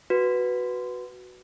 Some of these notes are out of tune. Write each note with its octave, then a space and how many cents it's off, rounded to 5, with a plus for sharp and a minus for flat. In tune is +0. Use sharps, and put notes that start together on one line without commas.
F#4 +0 B4 +0